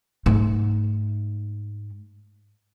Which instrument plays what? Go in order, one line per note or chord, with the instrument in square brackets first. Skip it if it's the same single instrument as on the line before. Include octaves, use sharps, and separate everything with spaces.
[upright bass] G#2 A3